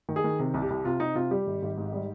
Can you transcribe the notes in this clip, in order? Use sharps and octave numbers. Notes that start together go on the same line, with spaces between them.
D#3
G#4
D#3
C3
C2
G4
C2
C3 F4
C3 D#4
C3 F4
G3 G4
G#1
G#1
G#2
G3